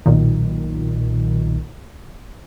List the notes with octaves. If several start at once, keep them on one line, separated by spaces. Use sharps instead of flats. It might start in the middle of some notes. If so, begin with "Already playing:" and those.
B1 A#2 D#3